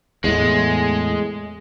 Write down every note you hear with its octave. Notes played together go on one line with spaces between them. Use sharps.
E2 A2 G#3